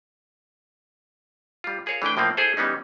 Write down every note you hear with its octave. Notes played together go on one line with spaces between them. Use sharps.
G3 F4
F4 G#4 A#4 C#5 F5
E3 A3 D4 B4 G5
A2 F3 A#3 C4
E4 G#4 A4 C5
E3 G3 B3 C#4 D#4